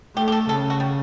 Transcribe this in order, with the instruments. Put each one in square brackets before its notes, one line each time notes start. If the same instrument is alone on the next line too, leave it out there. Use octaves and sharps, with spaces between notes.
[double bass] A3 [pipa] G4
[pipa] G4
A4
[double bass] C#3 [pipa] A4
[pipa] F#4
G3